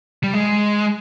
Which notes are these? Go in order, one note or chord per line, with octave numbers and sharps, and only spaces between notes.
G3
G#3